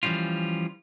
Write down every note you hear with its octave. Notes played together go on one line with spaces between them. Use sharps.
E3 F3 G3 C#4 F4